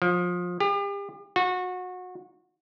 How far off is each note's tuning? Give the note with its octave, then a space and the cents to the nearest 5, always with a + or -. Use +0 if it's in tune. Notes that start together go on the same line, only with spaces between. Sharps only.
F3 +25
G4 +40
F#4 -25